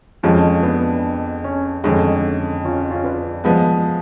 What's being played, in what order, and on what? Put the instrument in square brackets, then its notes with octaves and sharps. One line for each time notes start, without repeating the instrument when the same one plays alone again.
[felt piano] F2 F3 G#3 [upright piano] C#4 F4
[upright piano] B3 D4
C#4
[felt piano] F2 D3 G#3 [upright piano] C#4
[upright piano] C#4 F4
C#4 F4
B4 D5
[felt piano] F3 G#3 B3